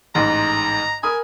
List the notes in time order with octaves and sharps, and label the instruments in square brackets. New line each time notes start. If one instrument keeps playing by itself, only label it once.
[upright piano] A1 G#2 [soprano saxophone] A#5
[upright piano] A#4 B5 D#6 [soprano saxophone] G#5